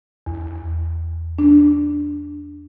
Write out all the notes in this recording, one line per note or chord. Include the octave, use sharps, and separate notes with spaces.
E2
D4